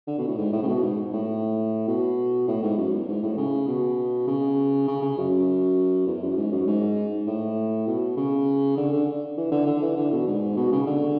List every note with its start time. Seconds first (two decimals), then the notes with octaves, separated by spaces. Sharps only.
0.07 D3
0.18 B2
0.27 A2
0.38 G#2
0.53 A2
0.62 C#3
0.68 B2
0.83 G#2
1.13 A2
1.87 B2
2.48 A2
2.63 G#2
2.77 F#2
2.93 E2
3.08 G#2
3.22 A2
3.37 C#3
3.68 B2
4.27 C#3
4.88 C#3
5.02 C#3
5.17 F#2
6.07 E2
6.22 F#2
6.37 G#2
6.52 F#2
6.67 G#2
7.27 A2
7.87 B2
8.17 C#3
8.77 D3
8.92 D3
9.37 E3
9.52 D3
9.66 D3
9.82 E3
9.97 D3
10.12 B2
10.27 G#2
10.57 B2
10.72 C#3
10.87 D3